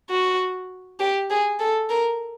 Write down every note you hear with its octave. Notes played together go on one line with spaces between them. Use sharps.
F#4
G4
G#4
A4
A#4